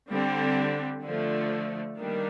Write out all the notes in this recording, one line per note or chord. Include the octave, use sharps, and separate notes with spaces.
D3 G3 C4
D3 F3 A3
D#3 G3 A#3 D4